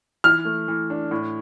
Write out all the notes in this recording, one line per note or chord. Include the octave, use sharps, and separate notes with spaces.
E3 F6
A3
E3
D4
A2